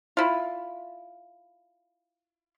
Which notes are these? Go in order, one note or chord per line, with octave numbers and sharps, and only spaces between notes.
E4 F4